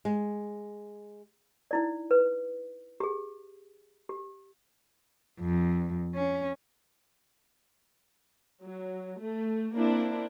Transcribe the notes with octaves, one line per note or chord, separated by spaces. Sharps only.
G#3
D#4 E4 D5
B4
G4 G#4
G4
F2
C#4
F#3
A3
A#3 C4 D4 E4